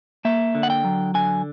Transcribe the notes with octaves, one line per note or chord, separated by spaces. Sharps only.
A#3 E5
D3
F#5
G5
F#3
D3 G#5